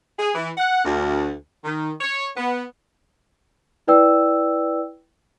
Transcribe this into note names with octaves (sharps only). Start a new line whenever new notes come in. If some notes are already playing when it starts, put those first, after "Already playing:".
G#4
E3
F#5
D2
D#3
C#5
B3
E4 B4 D5 G5 E6